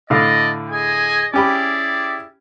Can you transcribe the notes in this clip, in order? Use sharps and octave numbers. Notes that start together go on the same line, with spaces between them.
A2 D3 D5 D#5 F5
G#4 D#5 G#5
C#4 E4 G4 G#4 D5 B5